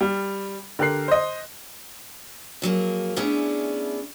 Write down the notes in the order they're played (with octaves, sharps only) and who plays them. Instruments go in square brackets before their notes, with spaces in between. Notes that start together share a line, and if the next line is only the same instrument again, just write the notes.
[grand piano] G3
D3 G4 A#4 F#6 C7
C5 D#5
[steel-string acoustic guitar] F2 F#3 A#3 G#4
A3 B3 C#4 D4 E4 G#4